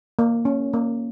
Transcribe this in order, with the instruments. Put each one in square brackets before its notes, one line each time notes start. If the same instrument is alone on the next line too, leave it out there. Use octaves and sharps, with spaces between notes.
[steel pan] A#3
C#4
A#3